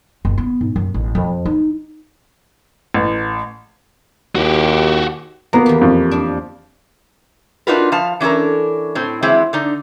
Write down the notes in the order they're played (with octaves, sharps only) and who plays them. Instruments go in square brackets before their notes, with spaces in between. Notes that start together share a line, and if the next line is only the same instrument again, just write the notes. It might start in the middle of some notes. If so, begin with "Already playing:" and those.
[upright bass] F#1
B3
G#2
F#2
A1
F2
D#4
[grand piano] A1
[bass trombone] D#2 [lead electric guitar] F#4 G4
[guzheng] A#3 [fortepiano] B3 A#5
[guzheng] E2 G4
[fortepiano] F2
[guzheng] D4
[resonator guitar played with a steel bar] D4 D#4 F4 F#4 A#4 B4
F3 F5 A5
E3 C#4 D4 A4 A#4
A2 C4
E3 F#3 G#3 C4 E4
D3 D#4 D5